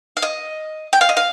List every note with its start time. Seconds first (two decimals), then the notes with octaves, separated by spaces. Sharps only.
0.17 F5
0.22 D#5
0.93 G5
1.01 F5
1.09 D#5
1.17 F5